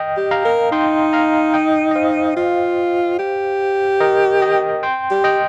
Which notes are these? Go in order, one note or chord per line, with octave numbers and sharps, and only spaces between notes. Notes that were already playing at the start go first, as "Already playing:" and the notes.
Already playing: D#5 G5
G4
F5 A#5
A#4
D#4 G5 C6
F5 A#5
D#5 G5
D#5
C5 F5
F4
G4
A#4 D#5
D#5 G5
G5 C6
G4
D#5 G5